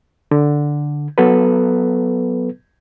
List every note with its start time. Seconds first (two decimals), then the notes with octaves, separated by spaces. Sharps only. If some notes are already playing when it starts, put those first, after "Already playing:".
0.31 D3
1.18 F#3 B3 A4 B4